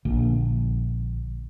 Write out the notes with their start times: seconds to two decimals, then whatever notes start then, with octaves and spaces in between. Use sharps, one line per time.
0.05 A#1 D3 A#3